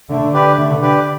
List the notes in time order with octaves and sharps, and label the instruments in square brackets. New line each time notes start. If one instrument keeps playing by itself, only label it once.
[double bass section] D3 [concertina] A3
[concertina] G4 B4 D5
[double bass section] D3 [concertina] A3
[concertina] G4 B4 D5